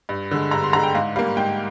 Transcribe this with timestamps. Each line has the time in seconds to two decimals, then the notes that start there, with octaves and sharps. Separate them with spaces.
0.09 G2
0.31 D3 G#3
0.51 G2 A#5
0.63 C6
0.73 D3 A#5
0.76 G#3
0.83 G5
0.95 G#2 F5
1.16 G3 F5
1.19 A#3
1.37 G#2 G5